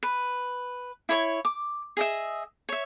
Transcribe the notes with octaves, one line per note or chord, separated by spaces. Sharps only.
B4
E4 C#5 C#6
D6
G#4 D#5 E5
C#5 E5